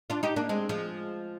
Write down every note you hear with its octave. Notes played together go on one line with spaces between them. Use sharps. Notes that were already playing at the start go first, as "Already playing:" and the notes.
D4 F4
D#4 G4
A#3 D4
G#3 C4
F3 G#3